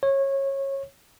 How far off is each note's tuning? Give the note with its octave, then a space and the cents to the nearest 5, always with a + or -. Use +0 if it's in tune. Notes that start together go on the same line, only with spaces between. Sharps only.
C#5 -20